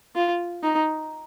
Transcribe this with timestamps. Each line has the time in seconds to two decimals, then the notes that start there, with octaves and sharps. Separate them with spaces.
0.15 F4
0.63 D#4